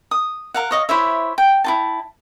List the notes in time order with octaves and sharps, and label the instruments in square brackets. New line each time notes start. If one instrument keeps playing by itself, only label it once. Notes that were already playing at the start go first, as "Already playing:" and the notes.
[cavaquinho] D#6
A#4 F5 F#5
C#5 D#5 F5
E4 C5 C#5 E5
G5
E4 F4 A5